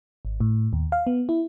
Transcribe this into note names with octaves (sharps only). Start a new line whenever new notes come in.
G#1
A2
D#2
F5
B3
E4